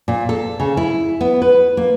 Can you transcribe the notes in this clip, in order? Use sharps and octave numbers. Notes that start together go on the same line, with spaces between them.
A#2
A4
C#3
E4
B3
B4
A#3